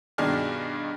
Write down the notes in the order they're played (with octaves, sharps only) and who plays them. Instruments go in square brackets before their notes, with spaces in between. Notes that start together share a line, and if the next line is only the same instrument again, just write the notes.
[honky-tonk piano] G2 B2 D#3 G#4 D5 F6